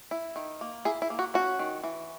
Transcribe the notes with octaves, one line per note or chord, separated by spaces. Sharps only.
E4
D#3
A#3
E4 G#4
E4
A#3
F#4
C#4 F#4
D#3
E3